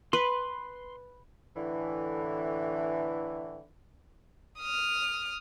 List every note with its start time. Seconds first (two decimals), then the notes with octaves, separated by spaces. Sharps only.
0.13 B4 C6
1.56 A2 D3 E3
4.59 D#6 F6